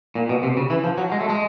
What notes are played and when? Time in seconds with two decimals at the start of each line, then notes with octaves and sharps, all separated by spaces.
0.15 A#2
0.29 B2
0.43 C3
0.57 C#3
0.70 E3
0.84 F3
0.98 F#3
1.12 G#3
1.20 A3
1.30 G#3